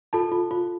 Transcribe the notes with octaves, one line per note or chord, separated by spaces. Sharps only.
F4 A4 A5
F4
F4